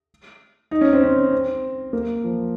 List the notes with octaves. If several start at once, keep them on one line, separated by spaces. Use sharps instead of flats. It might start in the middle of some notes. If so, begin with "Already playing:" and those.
D#4
C#4
C4
C#4
C4
A#3
F3